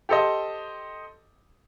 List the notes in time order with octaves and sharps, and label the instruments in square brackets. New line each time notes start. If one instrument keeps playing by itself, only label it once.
[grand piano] G4 A4 C5 D#5